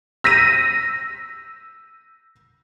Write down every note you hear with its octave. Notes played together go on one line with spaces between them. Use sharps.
E6 A#6 B6 D#7